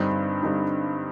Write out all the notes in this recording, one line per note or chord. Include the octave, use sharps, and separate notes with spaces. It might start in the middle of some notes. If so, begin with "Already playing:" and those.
Already playing: G2 D3 G3 C4 D#4
D3 G3 C4 D#4